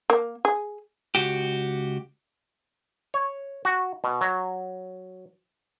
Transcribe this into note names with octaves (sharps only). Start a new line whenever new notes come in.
A#3
G#4
C#2 F#4 G4
C#5
F#4
B2
F#3